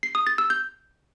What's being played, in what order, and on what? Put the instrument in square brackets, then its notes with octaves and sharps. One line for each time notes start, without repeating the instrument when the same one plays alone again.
[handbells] C7
D#6
A6
E6
G6